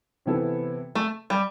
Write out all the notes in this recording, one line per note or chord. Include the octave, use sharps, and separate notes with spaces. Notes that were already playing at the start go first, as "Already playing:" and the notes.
C3 E3 B3 E4 A4
A3
G3